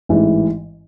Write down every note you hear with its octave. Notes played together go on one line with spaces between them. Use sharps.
A1 G#2 E3